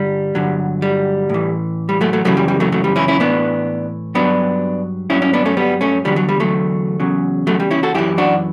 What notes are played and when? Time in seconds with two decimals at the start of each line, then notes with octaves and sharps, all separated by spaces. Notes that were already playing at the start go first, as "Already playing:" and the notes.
Already playing: G2 D3 G3
0.35 G2 D3 F#3
0.82 G3
1.29 A2 E3
1.89 G3
2.01 F#3 A3
2.13 F#3 A3
2.25 F#2 C#3 E3 F#3 A3
2.37 G3
2.48 G3
2.60 F#3 A3
2.72 F#3 A3
2.84 G3
2.96 C#4 E4
3.08 C#4 E4
3.20 A2 E3 B3 D4
4.15 G2 F#3 B3 D4
5.10 G2 F#3 C#4 E4
5.22 C#4 E4
5.33 B3 D4
5.45 A3 C#4
5.57 G3 B3
5.81 A3 C#4
6.05 E2 D3 F#3 G3
6.16 F#3
6.29 G3
6.40 F#3 A3
7.00 E2 C#3 F#3
7.47 F#3 A3
7.60 G3
7.71 C#4 E4
7.83 F#4 A4
7.94 F#2 E3 E4 G4
8.18 D4 F#4